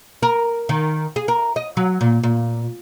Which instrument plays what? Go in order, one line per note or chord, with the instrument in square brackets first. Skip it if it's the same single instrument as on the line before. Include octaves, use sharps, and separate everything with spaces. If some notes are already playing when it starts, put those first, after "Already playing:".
[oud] A#4
D#3
G#4
A#4
D#5
F#3
A#2
A#2